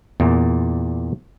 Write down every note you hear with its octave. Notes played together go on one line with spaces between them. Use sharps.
E2 A#2